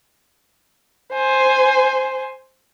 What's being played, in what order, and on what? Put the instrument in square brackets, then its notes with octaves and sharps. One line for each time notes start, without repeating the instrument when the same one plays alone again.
[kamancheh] C5 G#5